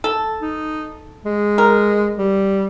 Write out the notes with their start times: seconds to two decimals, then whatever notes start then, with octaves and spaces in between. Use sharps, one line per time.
0.04 A4
0.41 D#4
1.25 G#3
1.58 A#4
2.17 G3